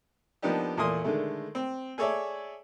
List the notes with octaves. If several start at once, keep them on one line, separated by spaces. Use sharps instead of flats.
F3 A#3 B3 D4 D#4 G4
E2 A#2 A3 G#5 C6 D#6
D3 D#3 G#3 A3
C4
G#4 A4 C#5 D5 E5